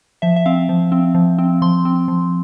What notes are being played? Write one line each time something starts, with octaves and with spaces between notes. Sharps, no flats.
F3 E5
E5
C4 F5
F3
C4
F3
C4
F3 C6
C4
F3